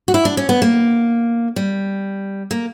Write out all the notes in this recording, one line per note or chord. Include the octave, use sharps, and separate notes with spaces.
F#4
E4
D4
C#4
B3
A#3
G3
A#3